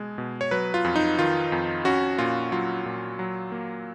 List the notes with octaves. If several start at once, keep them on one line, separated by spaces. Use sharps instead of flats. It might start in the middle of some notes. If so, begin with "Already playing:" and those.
Already playing: B2 G#3
B2
C#5
F#3 B4
F4
F2
D#4
D#3 F4
F2
C#4 F#4
A#2 F4
F#3 F4
A#2
F#3
A#3